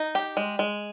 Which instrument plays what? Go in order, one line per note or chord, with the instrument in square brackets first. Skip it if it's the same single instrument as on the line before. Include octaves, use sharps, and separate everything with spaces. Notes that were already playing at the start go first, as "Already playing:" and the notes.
Already playing: [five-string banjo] D#4
G4
G#3
G#3